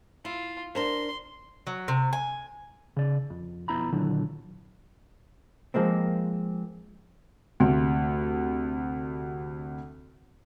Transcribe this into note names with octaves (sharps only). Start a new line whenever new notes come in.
E4 F4
D4 A#4 C5 C6
F#3
C3
G#5
C#3 D5
F2
B1 F2 B3 E4 A#5 B5
A#2 D3 D#3 F#3 E4
F3 G#3 A#3 C4
D2 C3